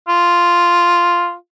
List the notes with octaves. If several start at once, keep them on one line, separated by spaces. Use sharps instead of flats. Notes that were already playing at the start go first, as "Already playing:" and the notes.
F4